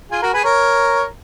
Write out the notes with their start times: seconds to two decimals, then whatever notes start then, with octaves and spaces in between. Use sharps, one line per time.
0.11 F4 G#4
0.22 F#4 A#4
0.34 G#4 B4
0.44 A#4 C#5